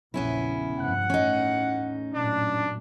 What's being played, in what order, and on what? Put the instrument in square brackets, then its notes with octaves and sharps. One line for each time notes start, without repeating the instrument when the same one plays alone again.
[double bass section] A#1 E2 C#3 [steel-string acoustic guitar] B3 C#4 E4
[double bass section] F1 G2 F3 [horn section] F#5
[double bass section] A1 E2 A2 [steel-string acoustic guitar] C#4 D#4
[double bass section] A1 F#2 A#2 [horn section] D4